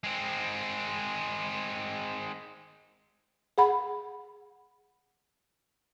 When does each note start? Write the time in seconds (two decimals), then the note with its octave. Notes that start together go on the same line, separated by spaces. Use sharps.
0.04 G#3 C4
3.58 G#4 F#5 B5